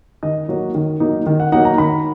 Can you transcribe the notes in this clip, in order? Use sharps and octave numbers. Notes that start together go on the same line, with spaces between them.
D#3 D#5
F#3 A#3 D#4
D#3
F#3 A#3 D#4
D#3
F#5
F#3 A#3 D#4 F#5
A#5
D#3 B5